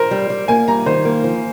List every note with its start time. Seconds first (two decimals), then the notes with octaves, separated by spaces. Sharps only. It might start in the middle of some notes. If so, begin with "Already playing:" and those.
Already playing: A#4 C5
0.11 G3
0.30 G3
0.48 A#3 G#5
0.68 G3 A#5
0.86 D#3 C5
1.05 A#3
1.24 F3